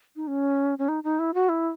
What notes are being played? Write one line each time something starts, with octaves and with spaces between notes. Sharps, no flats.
D#4
C#4
C#4
D#4
D#4
E4
F#4
E4